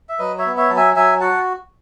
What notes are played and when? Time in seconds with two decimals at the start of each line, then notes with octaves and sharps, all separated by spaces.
0.09 E5
0.19 F#3 B4 D#5
0.38 C#5 E5
0.46 B3
0.57 C#5 E5
0.70 F#3 A5
0.76 E5 G#5
0.96 F#3 E5 G#5
1.21 F#4 F#5 A5